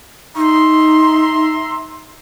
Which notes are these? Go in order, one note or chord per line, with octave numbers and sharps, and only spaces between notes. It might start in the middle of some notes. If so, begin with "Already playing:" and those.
D#4 E5 A#5 C6